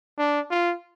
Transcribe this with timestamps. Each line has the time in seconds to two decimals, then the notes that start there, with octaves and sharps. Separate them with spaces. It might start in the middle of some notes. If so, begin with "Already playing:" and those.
0.18 D4
0.51 F4